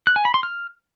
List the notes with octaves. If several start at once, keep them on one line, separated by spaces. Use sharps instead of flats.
F#6
G#5
B5
C6
F6